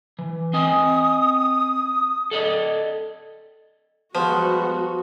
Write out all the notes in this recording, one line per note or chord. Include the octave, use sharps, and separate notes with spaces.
E3
C4 D#5 G#5 D#6
A4 D5 D#5
F3 G3 G#3 B3 F#4